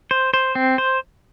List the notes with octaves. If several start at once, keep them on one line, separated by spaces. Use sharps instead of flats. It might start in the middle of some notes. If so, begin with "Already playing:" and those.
C5
C5
C4
C5